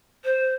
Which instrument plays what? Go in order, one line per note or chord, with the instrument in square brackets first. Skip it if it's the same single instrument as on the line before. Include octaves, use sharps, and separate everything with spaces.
[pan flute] C5